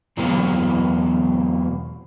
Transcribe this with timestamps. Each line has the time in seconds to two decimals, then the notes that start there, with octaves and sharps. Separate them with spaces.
0.17 E2 B2 E3 F#3 A#3 C4